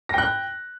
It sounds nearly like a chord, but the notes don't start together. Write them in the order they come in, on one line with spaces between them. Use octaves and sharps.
A#6 G5 F#6